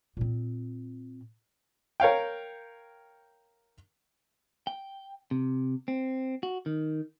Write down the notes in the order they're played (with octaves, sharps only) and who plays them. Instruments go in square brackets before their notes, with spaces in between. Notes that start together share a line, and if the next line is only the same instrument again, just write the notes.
[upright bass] A#2 C4
[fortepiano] A#4 C#5 F5 G5
[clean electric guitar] G5
C3
C4
F#4
D#3